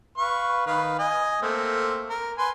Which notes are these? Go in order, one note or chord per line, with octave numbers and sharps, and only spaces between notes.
B4 F5 C#6
D#3 B4 F5
D#5 G#5
A3 A#3 C4
A#4
B4 G#5 C6